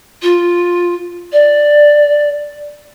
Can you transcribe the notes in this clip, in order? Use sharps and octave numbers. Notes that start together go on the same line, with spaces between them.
F4
D5